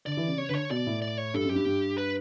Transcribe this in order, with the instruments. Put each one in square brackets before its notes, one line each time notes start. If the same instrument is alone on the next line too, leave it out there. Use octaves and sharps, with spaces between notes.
[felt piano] D3 [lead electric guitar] D5
[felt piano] E3
C#3
[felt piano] C#3 [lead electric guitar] C#5
[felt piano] D3 [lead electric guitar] B4
[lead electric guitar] C#5
[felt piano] B2 [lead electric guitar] D5
[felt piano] A2
[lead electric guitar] D5
C#5
[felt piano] G2 [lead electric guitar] A4
[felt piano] F#2
[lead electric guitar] G4
[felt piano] G2
G2
[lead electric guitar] B4